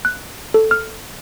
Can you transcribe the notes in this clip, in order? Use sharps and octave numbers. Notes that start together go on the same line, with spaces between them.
F#6
A4
F6